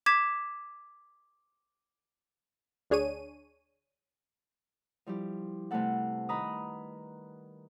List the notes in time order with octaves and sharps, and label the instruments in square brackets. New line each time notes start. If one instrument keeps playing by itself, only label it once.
[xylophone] D6 G#6 B6 E7
[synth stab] D2 D4 G#4 C#5 D#7
[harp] F3 G3 E4 G4
C3 G3 A3 B3 A4 F#5
D#3 B4 A#5 B5 D#6